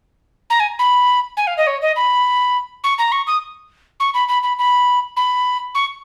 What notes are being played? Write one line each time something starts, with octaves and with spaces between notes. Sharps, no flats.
A#5
G#5
B5
G#5
F5
D#5
C#5
D#5
B5
C#6
A#5
C#6
D#6
C#6
B5
B5
B5
B5
B5
C#6